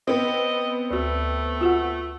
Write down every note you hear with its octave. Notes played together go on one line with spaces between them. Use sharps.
B3 C4 D#5
D2 A3 F#4
F4 F#4 F#5